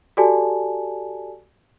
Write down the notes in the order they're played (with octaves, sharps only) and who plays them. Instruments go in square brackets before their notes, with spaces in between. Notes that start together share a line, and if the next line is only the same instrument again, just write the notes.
[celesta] F#4 G4 A4 D5 G#5 A5